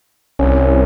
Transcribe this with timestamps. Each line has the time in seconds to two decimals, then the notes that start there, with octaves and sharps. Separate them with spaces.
0.39 C2 C#4